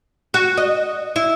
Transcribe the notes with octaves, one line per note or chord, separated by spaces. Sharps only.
F#4
D#5
E4